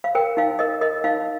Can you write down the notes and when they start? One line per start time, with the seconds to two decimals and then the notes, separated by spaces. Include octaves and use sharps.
0.04 F5
0.15 A#4 G5
0.37 D#4 F5
0.59 A#4 D#5
0.81 A#4 D#5
1.04 D#4 F5